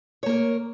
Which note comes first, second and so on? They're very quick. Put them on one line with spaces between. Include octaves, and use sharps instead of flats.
C#5 A#3 A#4